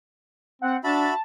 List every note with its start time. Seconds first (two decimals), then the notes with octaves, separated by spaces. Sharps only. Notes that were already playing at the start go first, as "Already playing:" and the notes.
0.62 C4 F#5
0.84 D4 F#4 E5 A5 B5